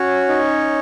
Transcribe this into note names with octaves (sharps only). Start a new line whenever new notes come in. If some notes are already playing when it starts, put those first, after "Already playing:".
Already playing: C#4 F#4 C#5
D#4